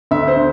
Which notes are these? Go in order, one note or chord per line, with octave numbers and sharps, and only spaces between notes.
D2 E5
C5
D3